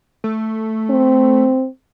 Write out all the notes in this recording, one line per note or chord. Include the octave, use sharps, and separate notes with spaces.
A3
C4